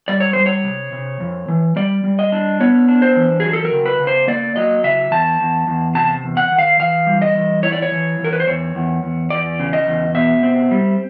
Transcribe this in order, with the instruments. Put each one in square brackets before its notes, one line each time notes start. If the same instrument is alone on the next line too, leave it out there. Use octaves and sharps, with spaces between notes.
[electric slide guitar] G3 D5
C#5
G3 C5
C#5
C3
C3
F2
E3
G3 D5
G3
D#5
D4
B3 C#5
D4
C5
E3
F#3 G#4
A4
A#4
C#3
B4
C#3
C5
A#3 D5
F#3 D#5
C#3 E5
E2 A5
E2
E2
C3 A5
E2
F#5
D#3
F5
E3 F5
G3
D#5
E3
E4 C#5
D5
C#5
E3
E3
A#4
B4
C5
E2 C#5
E2
E2
E2 D5
C#3
D#5
E2
B2 E5
C4
G3